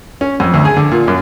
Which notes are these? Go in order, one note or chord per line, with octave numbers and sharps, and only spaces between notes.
C#4
F2
D2
G#4
D3
A#2
F#2